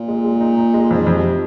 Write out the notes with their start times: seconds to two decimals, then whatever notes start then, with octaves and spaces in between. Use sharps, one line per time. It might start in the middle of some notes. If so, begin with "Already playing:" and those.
Already playing: A#2
0.08 G#3
0.25 G#3
0.41 D#4
0.58 D#4
0.74 G#3
0.91 F2 G#2
1.07 F2
1.14 C3